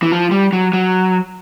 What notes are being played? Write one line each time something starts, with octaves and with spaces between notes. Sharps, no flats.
E3
F3
G3
F#3
F#3